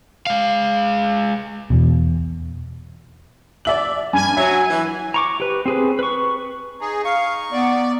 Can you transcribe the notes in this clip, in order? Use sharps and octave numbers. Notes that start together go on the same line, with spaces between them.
G#3 F5
E2 B2
D5 E5 F#7
G2 G#5
F#3 E5
E3
A#5 C#6 D6
G4 B4
C4 G#4 B4
B4 C#6
D#4 G#4
F5 C#6
B3 D5